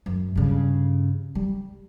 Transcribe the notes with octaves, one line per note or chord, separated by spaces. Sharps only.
F#2
G2 C#3
G3